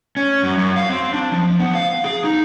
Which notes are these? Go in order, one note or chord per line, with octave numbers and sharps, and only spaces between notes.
C#4
F#2
F#2
F5
C4
D4
F3
B3
F5
G#4
D#4